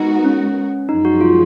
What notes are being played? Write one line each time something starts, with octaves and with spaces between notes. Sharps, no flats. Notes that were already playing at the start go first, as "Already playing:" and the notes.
Already playing: G#3 B3 D#4 F#4 A#4
C#4
F#2 F3 G#3 D#4
F#4
F4